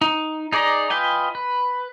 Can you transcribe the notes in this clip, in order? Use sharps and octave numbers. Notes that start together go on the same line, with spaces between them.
D#4
D#4 G#4 D5 D#5 A#5
F4 B4 D#5 G5 G#5
B4